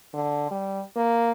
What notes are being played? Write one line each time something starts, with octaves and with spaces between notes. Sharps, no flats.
D3
G3
A#3